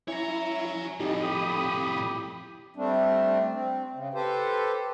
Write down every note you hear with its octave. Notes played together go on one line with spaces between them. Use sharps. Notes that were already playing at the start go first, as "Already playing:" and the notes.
C#4 E4 C#5 A#5
F2 A2 D#4 G4
G4 B5 D#6
G3 A3 C4 D4
C4
C#3
G4 A4 B4 C5